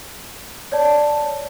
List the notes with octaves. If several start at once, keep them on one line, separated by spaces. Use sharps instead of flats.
C#5 D5 A5